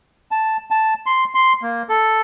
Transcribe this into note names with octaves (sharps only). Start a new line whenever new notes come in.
A5
A5
C6
C6
A#3
A4